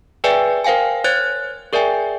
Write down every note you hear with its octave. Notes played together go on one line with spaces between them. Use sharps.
G#4 B4 D5 E5 G5 G#5
A#4 C5 F5 G5 G#5
C5 C#5 F#6 G#6 A6
G#4 A#4 D5 E5 G5 G#5